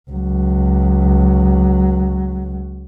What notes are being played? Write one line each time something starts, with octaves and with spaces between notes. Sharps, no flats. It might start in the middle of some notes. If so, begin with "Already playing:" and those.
C#2 F#3